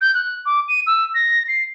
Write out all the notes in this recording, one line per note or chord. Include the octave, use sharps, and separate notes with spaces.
G6
F#6
D6
D#7
E6
A#6
C7